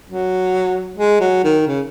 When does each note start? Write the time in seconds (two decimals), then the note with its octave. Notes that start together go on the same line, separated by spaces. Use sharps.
0.10 F#3
0.97 G#3
1.20 F#3
1.44 D#3
1.67 C#3